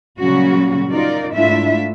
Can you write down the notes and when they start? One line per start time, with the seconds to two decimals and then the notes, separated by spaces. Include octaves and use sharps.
0.19 A#2 C#3 F#3 G3 C#4 F#4
0.91 D#4 F4 A#4 D5
1.32 G#2 A3 D4 E4 F4 E5